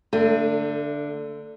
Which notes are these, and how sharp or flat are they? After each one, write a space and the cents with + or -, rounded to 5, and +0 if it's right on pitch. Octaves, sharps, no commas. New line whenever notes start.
D3 +0 A3 +35